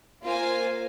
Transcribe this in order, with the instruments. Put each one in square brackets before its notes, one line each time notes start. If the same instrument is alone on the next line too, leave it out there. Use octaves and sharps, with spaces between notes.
[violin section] A#3 F4 C5 F5 G#5